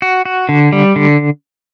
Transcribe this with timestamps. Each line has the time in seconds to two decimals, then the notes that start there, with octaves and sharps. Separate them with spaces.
0.02 F#4
0.25 F#4
0.49 D3
0.73 G3
0.96 D3